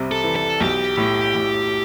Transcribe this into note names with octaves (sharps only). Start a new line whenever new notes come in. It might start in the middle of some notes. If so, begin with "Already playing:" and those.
Already playing: C2 C3
A4
E3
A4
B1 G4
A2
A2